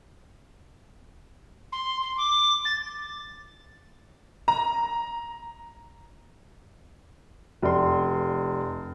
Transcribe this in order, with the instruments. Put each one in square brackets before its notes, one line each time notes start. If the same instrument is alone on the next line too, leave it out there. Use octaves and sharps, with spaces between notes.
[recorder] C6
C6
D6
A6
[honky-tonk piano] A#5
[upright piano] F1 D5 C6